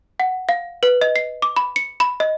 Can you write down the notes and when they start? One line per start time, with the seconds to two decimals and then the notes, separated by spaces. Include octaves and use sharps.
0.20 F#5
0.49 F5
0.83 B4
1.01 D#5
1.16 C7
1.42 D6
1.56 B5
1.76 C#7
2.00 B5
2.20 D#5